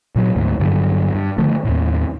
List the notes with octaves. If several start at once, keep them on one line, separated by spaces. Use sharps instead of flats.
A#2 F#3
D2 G#2
G2 D3 F#3
G2
D3 D#3 F3 A3
D#2 A2